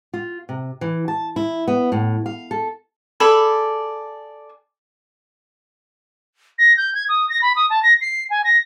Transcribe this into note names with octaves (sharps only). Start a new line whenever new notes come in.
F4
C3
E3
A5
E4
B3
A2
F5
A4
G#4 A4 D5 B5
A#6
G6
G#6
D#6
A#6
B5
D#6
A5
A#6
C7
G#5
A#6